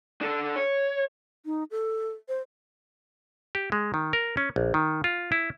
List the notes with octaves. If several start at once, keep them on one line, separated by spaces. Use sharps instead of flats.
D4 A4
C#5
D#4
A4
C5
G4
G#3
D#3
A#4
C#4
A#1
D#3
F4
E4